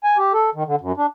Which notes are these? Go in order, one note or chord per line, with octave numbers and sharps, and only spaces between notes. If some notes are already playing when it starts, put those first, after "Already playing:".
G#5
G4
A4
D#3
D3
F#2
D4